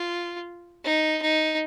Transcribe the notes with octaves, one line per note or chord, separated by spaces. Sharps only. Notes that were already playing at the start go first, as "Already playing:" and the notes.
Already playing: F4
D#4
D#4